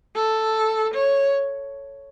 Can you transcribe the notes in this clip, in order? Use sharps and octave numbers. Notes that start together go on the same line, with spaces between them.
A4
C#5